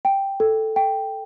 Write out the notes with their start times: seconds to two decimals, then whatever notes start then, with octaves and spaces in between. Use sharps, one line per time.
0.05 G5
0.40 A4
0.76 G5